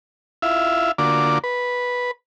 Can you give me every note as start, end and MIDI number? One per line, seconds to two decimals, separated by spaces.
0.42 0.92 64
0.42 0.92 65
0.42 0.92 76
0.42 0.92 77
0.98 1.39 50
0.98 1.39 58
0.98 1.39 65
0.98 1.39 66
0.98 1.39 74
0.98 1.39 86
1.44 2.11 71